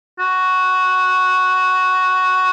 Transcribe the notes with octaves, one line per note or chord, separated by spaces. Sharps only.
F#4